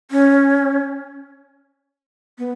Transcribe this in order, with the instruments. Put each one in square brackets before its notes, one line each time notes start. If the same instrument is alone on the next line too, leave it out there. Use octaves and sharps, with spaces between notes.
[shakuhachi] C#4
B3